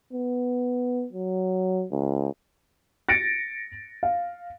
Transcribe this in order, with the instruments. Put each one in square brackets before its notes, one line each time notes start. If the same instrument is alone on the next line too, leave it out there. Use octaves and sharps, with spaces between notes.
[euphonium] B3
F#3
C#2
[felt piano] A6 A#6 C#7 D7
F5